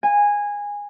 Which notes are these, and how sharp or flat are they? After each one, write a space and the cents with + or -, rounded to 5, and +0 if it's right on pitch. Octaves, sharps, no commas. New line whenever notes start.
G#5 -15